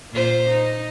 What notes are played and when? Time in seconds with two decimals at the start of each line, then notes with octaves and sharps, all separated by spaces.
0.12 A#2 F4 C5
0.49 D#4